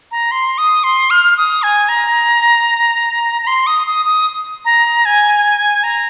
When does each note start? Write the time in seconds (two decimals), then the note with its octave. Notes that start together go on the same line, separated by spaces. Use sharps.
0.11 A#5
0.31 C6
0.58 D#6
0.84 C6
1.10 F6
1.37 D#6
1.63 G#5
1.89 A#5
3.42 A#5
3.47 C6
3.67 D#6
3.87 D#6
4.06 D#6
4.65 A#5
5.05 G#5
5.84 A#5